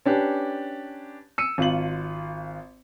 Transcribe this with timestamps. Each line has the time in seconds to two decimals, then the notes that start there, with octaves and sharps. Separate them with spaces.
0.06 C#4 D4 G4 B4
1.38 E6 C#7 D#7
1.58 G#1 F4 F#7